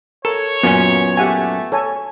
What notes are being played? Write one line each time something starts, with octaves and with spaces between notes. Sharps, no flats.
A4 A#4 C#5
F#2 A#2 B3 C#4
A3 G4 F#5 G#5
A4 C#5 G#5